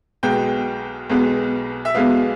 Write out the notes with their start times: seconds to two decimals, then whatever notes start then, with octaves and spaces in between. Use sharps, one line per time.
0.23 B1 B2 G#3 B3 G5
1.09 B1 B2 G#3 B3
1.85 E5
1.95 B1 B2 G#3 B3 F5